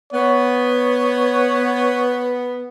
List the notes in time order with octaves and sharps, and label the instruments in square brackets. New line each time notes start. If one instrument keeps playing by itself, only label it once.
[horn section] B3 [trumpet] C#5